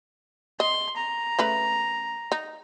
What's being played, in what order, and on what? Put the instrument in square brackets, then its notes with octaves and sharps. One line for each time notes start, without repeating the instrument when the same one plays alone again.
[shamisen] D#5 [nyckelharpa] C6
[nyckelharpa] A#5
[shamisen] C#3 A3 B4
D#4